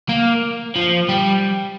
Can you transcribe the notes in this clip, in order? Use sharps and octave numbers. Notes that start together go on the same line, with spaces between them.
A#3
F3
G3